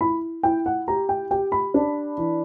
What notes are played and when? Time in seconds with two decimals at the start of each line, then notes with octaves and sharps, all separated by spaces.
0.01 E4 B5
0.43 E4 G5
0.66 F#5
0.88 G4 A#5
1.09 G5
1.31 G4 G5
1.52 B5
1.74 D4
2.17 E3